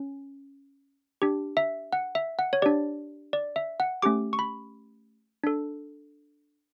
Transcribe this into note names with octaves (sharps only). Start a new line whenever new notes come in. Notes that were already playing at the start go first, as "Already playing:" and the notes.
Already playing: C#4
D4 G4
E5
F#5
E5
F#5
C#5
D4 G4 D5
D5
E5
F#5
A3 C#4 G4 D6
C#6
B5
D4 A4